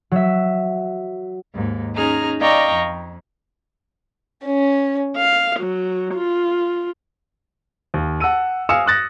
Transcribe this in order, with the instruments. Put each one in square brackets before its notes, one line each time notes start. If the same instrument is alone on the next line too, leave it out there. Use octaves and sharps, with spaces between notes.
[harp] F#3 E5
[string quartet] D#2 G#2
C#4 D#4 G#4 A#5 F6
D5 D#5 F5 G5 A#5 C#6
F2
C#4
F5
F#3
F4
[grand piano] D#2
F#5 A5 E6 D#7
F5 G#5 D#6 E6 C#7 E7
D#6 F#6 A6 A#6